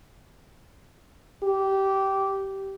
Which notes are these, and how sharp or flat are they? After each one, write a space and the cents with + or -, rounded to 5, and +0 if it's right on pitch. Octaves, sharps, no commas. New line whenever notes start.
G4 -15